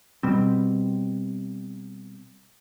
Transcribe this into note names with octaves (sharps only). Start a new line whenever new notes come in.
B2 G3 C4